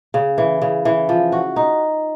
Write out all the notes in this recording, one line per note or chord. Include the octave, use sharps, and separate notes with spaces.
C#3
E3
C#3
E3
F3
F#4
D#4